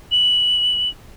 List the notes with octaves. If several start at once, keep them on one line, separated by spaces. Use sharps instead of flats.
F#7